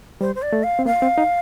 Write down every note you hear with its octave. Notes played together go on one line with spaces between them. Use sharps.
G3 C5
C5
D5
A3
F5
C4
A#3 F5
C4
D#4